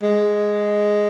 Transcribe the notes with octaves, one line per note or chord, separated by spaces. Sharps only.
G#3